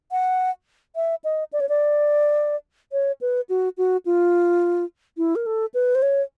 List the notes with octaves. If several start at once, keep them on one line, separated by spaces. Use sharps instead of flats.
F#5
E5
D#5
D5
C#5
D5
C#5
B4
F#4
F#4
F4
E4
A#4
A4
B4
C5
C#5